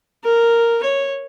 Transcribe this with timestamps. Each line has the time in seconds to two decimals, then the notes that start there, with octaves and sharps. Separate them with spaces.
0.24 A#4
0.83 C#5